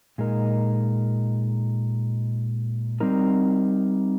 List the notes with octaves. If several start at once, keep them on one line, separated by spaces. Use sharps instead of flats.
A#2 G#3 D#4 A#4
G3 C4 D#4 A#4